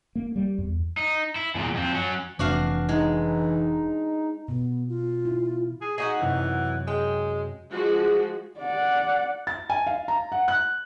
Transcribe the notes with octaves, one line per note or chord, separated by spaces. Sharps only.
A#3
G3
E2
D#4
E4
E2 A#2
F2 C4
F#3 C#4
F1 E3 D4 F#4 F5
G#3 D#4
B2 B3
F4
E4
G#4
D#4 F#4 G#4 F#5 B6
F#2 C3 E3
G#3 G5
F3 G#3 F#4 G#4
D5 F#5
A6
G#5
F5
A#5
F#5
F#6